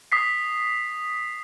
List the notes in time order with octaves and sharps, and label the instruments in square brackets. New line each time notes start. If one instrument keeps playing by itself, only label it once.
[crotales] D#6 B6 C7